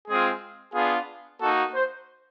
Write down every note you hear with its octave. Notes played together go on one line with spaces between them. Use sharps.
G#3 C4 F4 G#4
B3 D4 F4 G#4
A#3 D#4 F#4 A4
C5